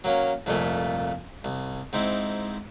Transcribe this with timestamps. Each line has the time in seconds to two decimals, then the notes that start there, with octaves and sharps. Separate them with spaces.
0.04 F#3 A#3 C#4
0.46 C2 F2 A#2 A3 G#5
1.44 C2
1.93 G#2 C4 D#4 E4